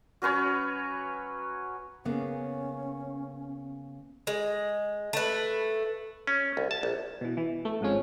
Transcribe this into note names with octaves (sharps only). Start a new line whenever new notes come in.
F#3 C#4 B4 C#5
C#3 A#3 B3 C#4
G#3
A3 B4
C#4
C2
A5
A#1
B2 E3
E3
A3
G#1 G#2 F3 C#4